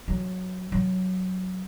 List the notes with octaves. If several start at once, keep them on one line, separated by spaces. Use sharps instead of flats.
F#3
F#3